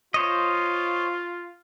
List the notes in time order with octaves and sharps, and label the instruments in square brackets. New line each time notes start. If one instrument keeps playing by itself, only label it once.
[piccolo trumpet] F4 [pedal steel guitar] C5 C#5 D#5